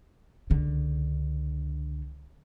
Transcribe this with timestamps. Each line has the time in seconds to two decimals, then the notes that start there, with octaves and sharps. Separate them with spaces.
0.50 C#2 D3